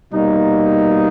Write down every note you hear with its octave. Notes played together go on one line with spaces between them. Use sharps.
B2 G3 A#3 D#4